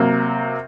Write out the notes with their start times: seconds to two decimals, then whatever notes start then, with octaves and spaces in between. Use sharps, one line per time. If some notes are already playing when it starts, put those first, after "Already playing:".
Already playing: C3 F#3 A#3